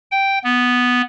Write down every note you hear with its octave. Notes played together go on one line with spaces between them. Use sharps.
G5
B3